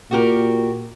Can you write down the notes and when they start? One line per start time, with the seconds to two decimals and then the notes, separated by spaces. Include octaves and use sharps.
0.11 A#2 F#4 G4 A#4